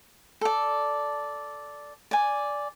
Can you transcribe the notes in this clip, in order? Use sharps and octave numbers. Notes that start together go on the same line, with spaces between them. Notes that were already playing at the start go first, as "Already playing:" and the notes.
A4 D5
D5 G#5